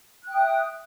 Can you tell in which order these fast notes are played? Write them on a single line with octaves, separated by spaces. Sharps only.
F#6 G5 D#6 E5